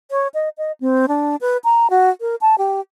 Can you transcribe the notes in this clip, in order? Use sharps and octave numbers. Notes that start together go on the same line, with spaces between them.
C#5
D#5
D#5
C4
D4
B4
A#5
F#4
A#4
A5
G4